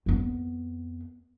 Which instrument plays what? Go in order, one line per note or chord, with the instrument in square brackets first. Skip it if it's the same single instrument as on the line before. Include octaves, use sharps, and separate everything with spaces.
[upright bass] F2 B3